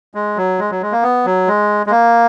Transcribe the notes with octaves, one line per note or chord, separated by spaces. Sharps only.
G#3
F#3
G#3
F#3
G#3
A#3
B3
F#3
G#3
G#3
A#3